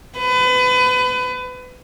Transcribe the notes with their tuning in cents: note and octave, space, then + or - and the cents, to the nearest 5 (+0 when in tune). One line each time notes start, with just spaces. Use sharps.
B4 +30